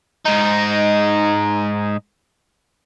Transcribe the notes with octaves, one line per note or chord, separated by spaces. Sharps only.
G#2 D#4